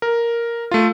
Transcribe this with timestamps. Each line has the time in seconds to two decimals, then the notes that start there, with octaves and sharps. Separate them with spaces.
0.02 A#4
0.71 A3 F4